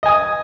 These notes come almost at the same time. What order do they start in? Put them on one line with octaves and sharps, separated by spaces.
D#5 G#5 D#6